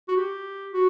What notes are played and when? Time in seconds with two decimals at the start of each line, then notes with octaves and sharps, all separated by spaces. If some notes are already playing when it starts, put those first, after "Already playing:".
0.08 F#4
0.17 G4
0.73 F#4